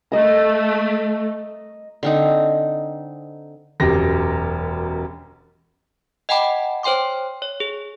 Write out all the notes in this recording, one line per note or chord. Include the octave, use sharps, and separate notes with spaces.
A3 D#5 A#5
D3 C4 D#4
E1 F#2 G4 A#6
D#5 F#5 G5 A5 B5 D6
C5 C#5 G5 C6 D6
C#5
G#4